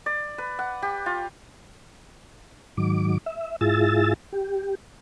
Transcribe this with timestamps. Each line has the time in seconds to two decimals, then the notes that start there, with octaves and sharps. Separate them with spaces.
0.06 D5
0.38 B4
0.59 F#5
0.82 G4
1.06 F4
2.77 G#2 D#3 F#3 D6
3.26 E5
3.61 G#2 E4 F4 G#4 E6 A6
4.32 G4